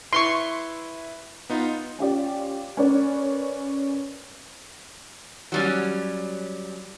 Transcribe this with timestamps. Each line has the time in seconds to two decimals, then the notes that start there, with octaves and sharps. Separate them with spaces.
0.13 E4 B4 C6 C#6
1.50 B3 D#4 F4
1.99 C#4 F4 G4 D5
2.77 C#4 A#4 B4 C#5 D5
5.52 F#3 G3 C#4